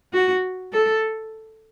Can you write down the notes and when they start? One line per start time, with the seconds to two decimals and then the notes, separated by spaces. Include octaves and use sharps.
0.13 F#4
0.73 A4